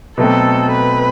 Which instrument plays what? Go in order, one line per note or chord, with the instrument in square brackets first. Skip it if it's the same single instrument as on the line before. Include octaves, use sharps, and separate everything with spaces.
[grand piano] B2 F#3 A3 C4 [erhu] A4
[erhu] B4